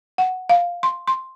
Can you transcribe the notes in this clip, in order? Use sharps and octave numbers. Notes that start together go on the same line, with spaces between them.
F#5
F5
C6
C6